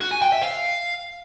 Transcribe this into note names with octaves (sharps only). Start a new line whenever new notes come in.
F#4
G#5
G5
E5
F5